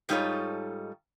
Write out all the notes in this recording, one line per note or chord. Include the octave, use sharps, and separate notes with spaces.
G#2 G3 D#4 F4 A4 C#5